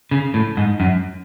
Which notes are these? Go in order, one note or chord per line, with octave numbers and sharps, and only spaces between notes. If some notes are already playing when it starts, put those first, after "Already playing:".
C#3
A2
G#2
F#2